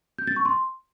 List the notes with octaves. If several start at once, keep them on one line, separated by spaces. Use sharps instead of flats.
G6
A6
C#6
C6